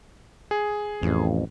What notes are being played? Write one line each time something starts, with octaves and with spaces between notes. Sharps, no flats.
G#4
A1 F2